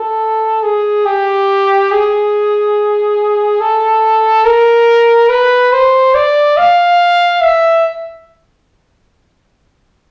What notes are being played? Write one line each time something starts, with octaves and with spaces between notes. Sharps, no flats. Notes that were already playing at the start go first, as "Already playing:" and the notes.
Already playing: A4
G#4
G4
G#4
A4
A#4
B4
C5
D5
F5
E5